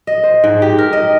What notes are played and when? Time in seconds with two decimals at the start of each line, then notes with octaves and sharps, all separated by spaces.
0.07 D#5
0.23 C5
0.44 G#2
0.62 G4
0.78 A#4
0.93 D#5